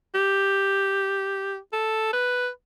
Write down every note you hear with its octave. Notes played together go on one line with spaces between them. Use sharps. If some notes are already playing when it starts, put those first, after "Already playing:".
G4
A4
B4